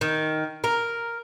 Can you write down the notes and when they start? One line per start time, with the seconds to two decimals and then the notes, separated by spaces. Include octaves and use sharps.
0.01 D#3
0.64 A#4